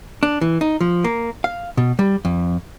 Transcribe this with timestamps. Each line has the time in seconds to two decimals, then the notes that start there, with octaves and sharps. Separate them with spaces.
0.23 D4
0.41 E3
0.61 D#4
0.81 F3
1.04 A#3
1.44 F5
1.77 B2
1.99 G3
2.25 F2